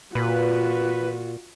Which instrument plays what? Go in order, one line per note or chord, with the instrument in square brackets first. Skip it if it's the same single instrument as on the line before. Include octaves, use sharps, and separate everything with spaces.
[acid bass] A#2 [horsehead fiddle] F4 F#4 [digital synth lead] B4